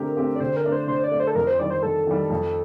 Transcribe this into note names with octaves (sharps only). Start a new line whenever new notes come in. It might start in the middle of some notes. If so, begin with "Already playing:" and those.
Already playing: D3 A3 C4 G4 A#4
A3 C4 G4
D5
D3 C5
A#4
A3 D4
C5
D3 C5
D5
A3 D4
C5
A4
F2 A#4
C5
D#3 G3 D5
C5
F2 A4
D#3 G3
F2